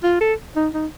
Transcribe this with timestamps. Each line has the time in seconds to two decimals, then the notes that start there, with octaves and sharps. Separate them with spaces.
0.04 F4
0.21 A4
0.56 D#4
0.74 D#4